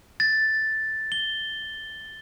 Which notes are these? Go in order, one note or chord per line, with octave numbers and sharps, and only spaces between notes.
A6
G7